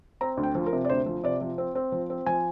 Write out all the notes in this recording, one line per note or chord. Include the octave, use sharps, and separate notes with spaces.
C4 A#5
D2
G5
F3
A#4
C3
D5
D2 C5
F3
C3 D5
F3
C4
C4
F3
C4
F3 G#5